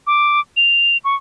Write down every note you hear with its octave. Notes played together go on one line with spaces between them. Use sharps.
D6
F7
C#6